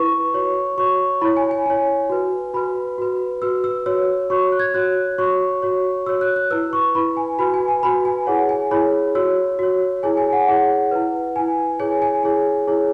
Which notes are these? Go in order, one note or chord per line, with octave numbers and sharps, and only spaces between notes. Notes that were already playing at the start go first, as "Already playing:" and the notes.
Already playing: E4 B4 C#6
F#4 C#5
F#4 C#5 C#6
E4 C#5 B5
G#5
G#5
E4 C#5 G#5
F#4 B4
F#4 B4 B5
F#4 B4
F#4 B4 E6
E6
F#4 C#5 E6
F#4 C#5 C#6
F#6
G#6
F#4 C#5 F#6
F#4 C#5 C#6
F#4 C#5
F#4 C#5 E6
F#6
F#6
E4 B4 E6
C#6
E4 B4 B5
G#5
F#4 B4 B5
G#5
G#5
F#4 B4 B5
G#5
E4 G#4 C#5 F#5
G#5
E4 G#4 C#5 B5
F#4 C#5 E6
F#4 C#5
E4 G#4 C#5 G#5
G#5
F#5
E4 G#4 C#5 F#5
E4 B4
E4 B4 G#5
E4 G#4 C#5 G#5
G#5
E4 G#4 C#5 G#5
E4 G#4 C#5